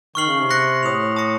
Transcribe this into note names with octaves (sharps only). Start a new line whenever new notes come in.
D#3 C#6 F6 C7 F#7
C#3
C3
C6 F#6 A#6 C#7
A2 D#6 A#6 F7
A5 D#6 A#6 C#7